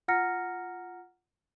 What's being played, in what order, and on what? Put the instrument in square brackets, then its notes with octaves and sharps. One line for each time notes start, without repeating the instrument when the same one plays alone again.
[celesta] F4 F#5 A#5 F6 A#6 C#7